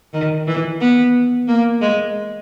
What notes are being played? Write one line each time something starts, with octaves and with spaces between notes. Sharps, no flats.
D#3
E3
B3
A#3
G#3